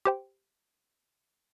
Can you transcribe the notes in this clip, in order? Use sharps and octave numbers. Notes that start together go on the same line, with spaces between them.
G4 C5 G5